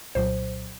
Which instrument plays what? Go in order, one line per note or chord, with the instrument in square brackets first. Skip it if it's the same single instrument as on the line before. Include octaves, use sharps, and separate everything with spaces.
[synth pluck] C2 A#2 F#3 C5